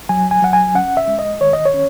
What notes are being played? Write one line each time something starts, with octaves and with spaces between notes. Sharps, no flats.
F#3 G#5
G#5
F#3 F#5
G#5
C#4 F#5
E5
G#3
D#5
D#3 C#5
D#5
C#5
C#4